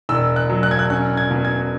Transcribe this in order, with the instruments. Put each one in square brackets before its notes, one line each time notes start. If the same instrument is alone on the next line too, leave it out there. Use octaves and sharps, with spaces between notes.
[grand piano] E1 E6
F#6
F#3
F#6
G#6
F#6
C#4 F#6
G#6
B2
G#6